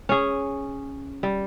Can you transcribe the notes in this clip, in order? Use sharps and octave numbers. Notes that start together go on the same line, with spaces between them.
C#4 G#4
G3